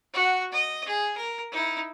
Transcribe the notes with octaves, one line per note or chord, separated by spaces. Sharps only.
F#4 F#5
D#5
G#4
A#4
D#4 E4